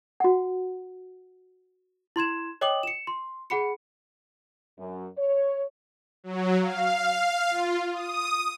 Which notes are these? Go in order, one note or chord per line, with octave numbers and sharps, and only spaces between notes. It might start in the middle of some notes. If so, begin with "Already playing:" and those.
F#4 F#5
E4 C6 G#6 E7
C#5 D#5 G5 D6 D#6 F#7
C#7 E7
C6
G#4 F#5 B5 C#7
F#2
C#5
F#3
F5
F4
D#6